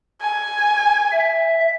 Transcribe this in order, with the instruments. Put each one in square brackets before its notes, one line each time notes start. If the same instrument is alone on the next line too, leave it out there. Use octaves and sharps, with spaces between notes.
[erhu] G#5
[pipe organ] E5